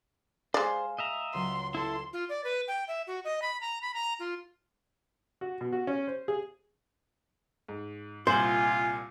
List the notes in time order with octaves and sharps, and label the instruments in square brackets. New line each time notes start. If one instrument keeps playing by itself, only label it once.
[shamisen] G#3 D5 [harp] G#4 F5 G#5 [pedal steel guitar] C5
[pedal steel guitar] D#5 E5 A#5
[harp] C#2 F#3 [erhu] C6
[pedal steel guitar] E4 A4 [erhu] C6
[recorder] F4
D5
B4
G5
E5
F#4
D#5
B5
A#5
B5
A#5
F4
[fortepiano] F#4
B2
F#4
C#4
C5
G#4
[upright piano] G#2
[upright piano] C2 A#2 F#7 [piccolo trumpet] F4 [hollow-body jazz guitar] C5 [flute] G#5